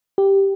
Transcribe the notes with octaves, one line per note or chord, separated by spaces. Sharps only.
G4